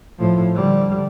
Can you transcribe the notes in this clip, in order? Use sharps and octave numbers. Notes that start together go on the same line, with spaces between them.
A2 F3
D3 G3